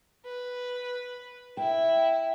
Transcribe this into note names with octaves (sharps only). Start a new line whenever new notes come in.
B4
E4 G5